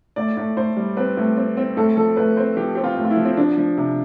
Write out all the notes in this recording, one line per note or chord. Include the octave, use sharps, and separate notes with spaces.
A2 D5
A2
A2 C5
G3
C4 B4
A2
C4
C4
A2 A4
F3 A4
A2 B4
C4 C5
F3 G4
C4 G4
F4
A2
F4
E4
F3
C4
F3 D4
F3
C3